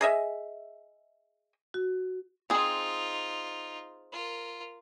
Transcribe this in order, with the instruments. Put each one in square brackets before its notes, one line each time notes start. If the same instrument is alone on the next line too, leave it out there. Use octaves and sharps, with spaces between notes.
[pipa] G#4 D#5 E5
[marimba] F#4
[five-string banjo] C4 G#4 [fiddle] D#4 F4
[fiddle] F4 A#4